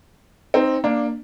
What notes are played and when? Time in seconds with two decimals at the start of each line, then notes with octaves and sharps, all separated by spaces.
0.54 C4 D#4
0.84 A#3 D4